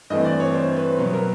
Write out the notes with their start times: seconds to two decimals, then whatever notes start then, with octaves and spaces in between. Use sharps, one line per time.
0.10 G2 E3 A3 C4 D#5
0.25 D5
0.40 C#5
0.54 C5
0.77 B4
0.98 B2 F#3 B3
1.13 A#4